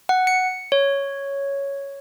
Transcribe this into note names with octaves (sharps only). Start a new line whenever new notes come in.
F#5
C#7
C#5